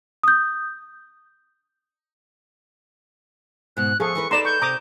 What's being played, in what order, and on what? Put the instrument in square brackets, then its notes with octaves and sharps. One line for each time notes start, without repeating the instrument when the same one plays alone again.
[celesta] D#6 G6
[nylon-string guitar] G#2 B2 [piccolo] F#6
[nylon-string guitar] F3 F5 [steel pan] G#4 A4 [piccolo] C#6
[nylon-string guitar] E3 A#4 B4
[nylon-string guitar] D#4 A4 B4 [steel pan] D5 A#5 C6 [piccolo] E7
[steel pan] C#6 [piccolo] G6
[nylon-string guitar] C3 [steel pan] A#5 D6 D#6